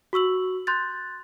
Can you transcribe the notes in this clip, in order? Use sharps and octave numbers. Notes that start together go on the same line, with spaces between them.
F#4 C#6 E6 F#7
C6 F#6 G6 A6